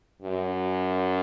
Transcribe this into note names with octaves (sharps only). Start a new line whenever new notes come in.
F#2